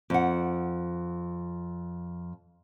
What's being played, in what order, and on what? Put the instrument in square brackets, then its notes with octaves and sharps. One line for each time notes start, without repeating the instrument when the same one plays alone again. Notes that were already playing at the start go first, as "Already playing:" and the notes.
[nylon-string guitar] F2 F#5